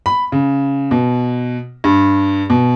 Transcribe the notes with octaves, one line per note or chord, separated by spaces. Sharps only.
B5
C#3
B2
G2
B2